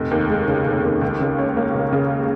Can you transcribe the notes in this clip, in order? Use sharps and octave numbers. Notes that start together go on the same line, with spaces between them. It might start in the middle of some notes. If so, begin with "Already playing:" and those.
Already playing: F1
D#2
G#3
C#3
F1
D#2
C#2
C#3
C#4
A#3
C#2
C#3